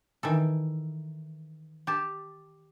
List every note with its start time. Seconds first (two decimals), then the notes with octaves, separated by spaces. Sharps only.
0.23 D#3 E3 A4
1.87 G4 A5